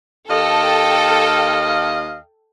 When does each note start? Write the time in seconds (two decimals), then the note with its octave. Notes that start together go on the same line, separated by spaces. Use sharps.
0.30 D#2 A4 D#5 F5 G5